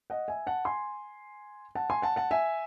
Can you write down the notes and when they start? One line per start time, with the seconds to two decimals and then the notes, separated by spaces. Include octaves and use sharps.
0.10 D#5 F#5
0.28 E5 G#5
0.47 F#5 A5
0.65 G#5 C6
1.75 F#5 A5
1.90 G#5 C6
2.02 F#5 A5
2.16 F#5 A5
2.31 E5 G#5